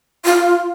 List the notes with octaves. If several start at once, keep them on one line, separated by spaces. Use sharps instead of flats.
F4